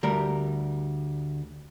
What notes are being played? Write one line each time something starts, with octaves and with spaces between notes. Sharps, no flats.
D2 G3 A#4